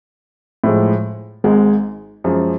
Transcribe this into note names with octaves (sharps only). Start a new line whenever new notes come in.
A2 F3 G#3
G#1 G#2 G#3
F#2 F3 G#3